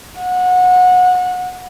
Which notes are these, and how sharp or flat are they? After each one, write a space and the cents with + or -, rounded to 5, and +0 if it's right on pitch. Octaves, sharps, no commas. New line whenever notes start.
F#5 -25